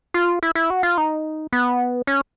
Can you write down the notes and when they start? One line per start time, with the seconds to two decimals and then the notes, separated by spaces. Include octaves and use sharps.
0.14 F4
0.43 E4
0.55 E4
0.70 F#4
0.83 F4
0.98 D#4
1.53 B3
2.07 C#4